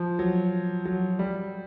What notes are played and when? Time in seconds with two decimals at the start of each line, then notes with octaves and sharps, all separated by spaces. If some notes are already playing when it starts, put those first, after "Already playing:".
Already playing: F3
0.19 F#3
0.85 F#3
1.19 G3